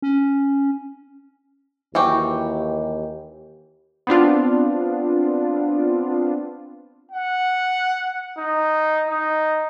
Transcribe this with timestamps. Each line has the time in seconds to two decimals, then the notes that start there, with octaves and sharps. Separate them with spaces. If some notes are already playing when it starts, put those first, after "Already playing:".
0.02 C#4
1.95 D#2 E3 F#4 G4
4.07 B3 C4 D4 F4
7.12 F#5
8.38 D#4
9.08 D#4